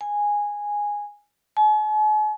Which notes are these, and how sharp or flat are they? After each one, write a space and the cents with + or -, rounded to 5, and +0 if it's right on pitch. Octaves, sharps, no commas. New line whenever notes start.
G#5 -5
G#5 +45